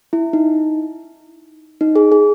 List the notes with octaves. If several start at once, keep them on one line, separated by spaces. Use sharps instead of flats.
E4
D#4
D#4
G#4
G#4